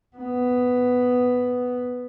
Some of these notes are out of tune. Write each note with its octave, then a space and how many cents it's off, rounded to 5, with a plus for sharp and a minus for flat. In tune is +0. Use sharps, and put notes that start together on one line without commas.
B3 +5